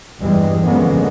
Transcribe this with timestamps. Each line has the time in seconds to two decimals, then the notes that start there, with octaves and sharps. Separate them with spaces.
0.20 E2 G2 E3 G3 G#3
0.65 D3 F3 G#3 A#3 B3 C#4